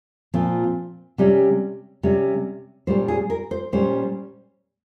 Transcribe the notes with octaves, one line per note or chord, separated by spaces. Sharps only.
A#2 F3 C4
C3 G3 C#4
C3 G3 C#4
A#2 G3 C#4 C5
G#4
A#4
C5
A#2 G3 C#4 C5